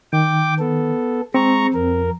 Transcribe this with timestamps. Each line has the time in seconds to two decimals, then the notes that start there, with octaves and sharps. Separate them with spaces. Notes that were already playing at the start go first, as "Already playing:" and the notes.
0.13 D#3 G5 D6
0.59 B3 A4
1.34 G#3 C4 A#5 C#6
1.74 F2 A#4